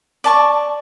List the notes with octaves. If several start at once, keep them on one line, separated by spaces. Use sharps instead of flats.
D5 A5 C#6